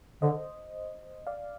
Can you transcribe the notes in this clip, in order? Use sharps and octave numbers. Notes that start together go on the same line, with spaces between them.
D3 C5 D#5
D5 F5